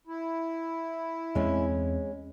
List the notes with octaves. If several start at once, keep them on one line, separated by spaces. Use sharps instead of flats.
E4
E2 G#3 C4 C#4